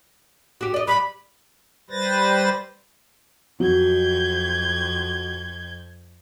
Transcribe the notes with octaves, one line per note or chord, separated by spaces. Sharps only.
F#4 G4
D5 D#5
G3 B5
G3 B4 C5 A6 A#6
F2 F#3 G6 G#6